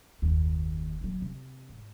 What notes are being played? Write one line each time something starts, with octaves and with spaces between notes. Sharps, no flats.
F#1 D#2
D#1 F#3
C3
G#2